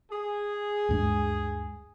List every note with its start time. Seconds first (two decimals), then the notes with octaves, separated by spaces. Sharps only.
0.11 G#4
0.89 D2 G2 G#3